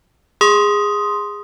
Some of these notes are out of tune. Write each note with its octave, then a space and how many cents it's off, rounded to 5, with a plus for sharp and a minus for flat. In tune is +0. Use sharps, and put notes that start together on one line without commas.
G#4 -20 C6 +0 D#6 +5